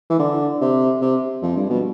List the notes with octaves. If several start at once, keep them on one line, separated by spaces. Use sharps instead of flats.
E3
D3
C3
C3
F2
G2
B2